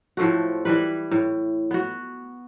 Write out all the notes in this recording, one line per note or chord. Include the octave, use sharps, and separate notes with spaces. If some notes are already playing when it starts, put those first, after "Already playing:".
A2 F3 A3 F#4
E3 G3 B4
A2
B3 F#4